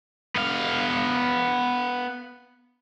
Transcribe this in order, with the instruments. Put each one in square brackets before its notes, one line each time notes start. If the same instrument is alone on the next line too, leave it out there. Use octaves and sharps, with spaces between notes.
[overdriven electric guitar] B3 F5